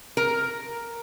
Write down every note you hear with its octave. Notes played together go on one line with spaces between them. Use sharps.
A#4